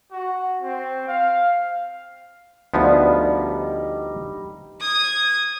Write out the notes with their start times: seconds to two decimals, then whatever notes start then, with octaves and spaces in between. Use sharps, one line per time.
0.12 F#4
0.62 C4
1.08 F5
2.74 D2 F3 G3 B3 D#4
4.81 D#6 G#6